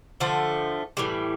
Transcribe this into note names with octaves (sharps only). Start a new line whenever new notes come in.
D3 F3 A3
A2 E3 G3